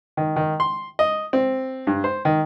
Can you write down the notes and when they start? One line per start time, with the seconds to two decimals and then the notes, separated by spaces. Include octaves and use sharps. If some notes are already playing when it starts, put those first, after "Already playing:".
0.17 D#3
0.36 D#3
0.60 C6
0.99 D#5
1.33 C4
1.87 G2
2.04 C5
2.25 D#3